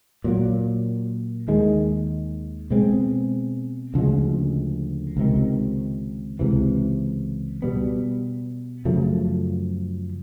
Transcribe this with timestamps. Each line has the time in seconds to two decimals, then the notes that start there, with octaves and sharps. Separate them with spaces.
0.24 A#2 F#3 A#3
1.47 D#2 D#3 G#3
2.70 B2 G#3 C4
3.94 D2 C#3 F3 G#3
5.17 C#2 C3 D#3
6.39 C#2 C3 E3
7.62 B2 G3 B3
8.85 F#2 C#3 F3 A3